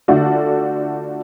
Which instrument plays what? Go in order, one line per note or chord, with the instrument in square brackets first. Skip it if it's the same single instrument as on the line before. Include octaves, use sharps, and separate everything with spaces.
[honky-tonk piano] D3 A3 D4 F4 F#4 A4